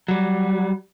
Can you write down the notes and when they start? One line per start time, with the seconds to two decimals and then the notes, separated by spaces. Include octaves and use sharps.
0.08 F#3 G3